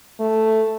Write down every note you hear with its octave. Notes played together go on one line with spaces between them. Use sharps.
A3